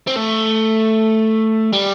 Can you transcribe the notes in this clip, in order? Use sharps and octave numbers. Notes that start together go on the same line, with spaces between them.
C4
A3
G3